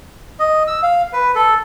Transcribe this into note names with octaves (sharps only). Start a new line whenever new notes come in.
D#5
E6
F5
B4
A4